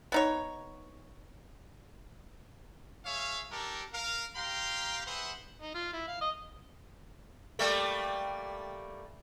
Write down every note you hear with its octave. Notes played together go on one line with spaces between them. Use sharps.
B3 D#4 C#5
G#4 C#5 E5 F5
D4 G4 A4 A#4
A#4 F5
G4 F5 G5 A#5 C6
G#4 B4 C5 E5 F#5
D#4
F4
E4
F5
D#5
G3 A3 A#3